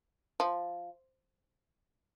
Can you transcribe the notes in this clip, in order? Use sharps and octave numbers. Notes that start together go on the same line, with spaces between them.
F3